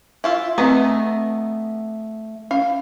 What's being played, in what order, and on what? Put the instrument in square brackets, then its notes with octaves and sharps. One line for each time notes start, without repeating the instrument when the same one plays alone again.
[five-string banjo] E4 F4 E5
[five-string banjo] E3 B3 D#5 [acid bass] A3 [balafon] C4 B4 A#5
[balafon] C#4 [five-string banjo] F5